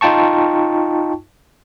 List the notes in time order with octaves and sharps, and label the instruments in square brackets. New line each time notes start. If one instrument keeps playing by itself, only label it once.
[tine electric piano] D#4 F4 G5 A5 C#6